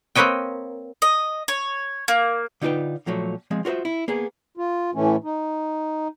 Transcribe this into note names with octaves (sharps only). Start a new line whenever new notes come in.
A#3 C4 B4 C#5 D#5 G5
D#5
C#5
A#3
D3 D#4 F4 G4 B4 G5
A#2 F3 F#3 A3
F3 G#3 C4
F4 F#4 A#4 C5 E5
E4
A#3 B3 G#4
F4
A2 E3 A3 C#4
D#4